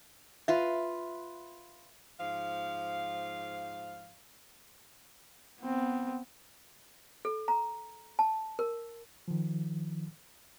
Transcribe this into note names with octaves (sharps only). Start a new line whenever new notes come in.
F4 B4 E5
G#2 F3 F5
B3 C4
A4
A#5
A5
A#4
D#3 F3